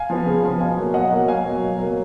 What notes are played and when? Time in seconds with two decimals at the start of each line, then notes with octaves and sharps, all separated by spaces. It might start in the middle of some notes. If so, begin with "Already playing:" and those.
Already playing: F5 G#5
0.10 F3 B3
0.26 C#3
0.43 F3 B3
0.60 B2 F5 G#5
0.77 F#3 A#3
0.94 B2 D#5 F#5
1.11 F#3 A#3
1.28 B2 F5 G#5
1.45 F#3 A#3
1.62 B2
1.79 F#3 A#3